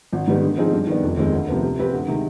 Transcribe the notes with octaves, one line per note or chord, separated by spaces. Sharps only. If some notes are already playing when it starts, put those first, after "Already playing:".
G#1
G#2 D#3 G3 B3
D3
F3 C4 D#4 G#4
G2
D#3 B3 D4
F1
D#2 D#3 G#3 C4
D2
C3 F3 B3
C3
F3 C4 G4 B4
D2
C3 D#3 G#3